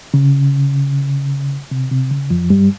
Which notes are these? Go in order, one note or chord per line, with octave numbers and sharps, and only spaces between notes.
C#3
C3
C3
C#3
F2 F3
G2 G3